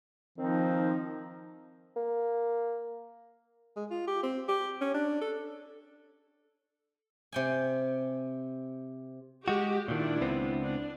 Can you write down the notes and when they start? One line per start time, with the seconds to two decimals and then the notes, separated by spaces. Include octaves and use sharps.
0.38 D#3 F3 C4 D#4
1.96 A#3
3.76 G#3
3.91 F4
4.07 G4
4.23 C4
4.48 G4
4.81 C#4
4.94 D4
5.21 A4
7.32 C3 G5 G#5
9.48 G#3 F#4 G4
9.88 A#2 D#3 D4 E4
10.21 C#2 B3 C4
10.63 D4